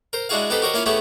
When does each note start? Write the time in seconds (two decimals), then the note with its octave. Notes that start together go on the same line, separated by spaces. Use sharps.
0.13 A#4 C5
0.29 G#3 D4 E4 F#4 G#4 F5
0.50 B3 D#4 G4 A4 B4 C5
0.62 F#4 G4 A#4 C5 C#5 D#5
0.74 A#3 C#4 E4 F4 C#5 F5
0.86 A3 B3 C#4 E4 G4 G#4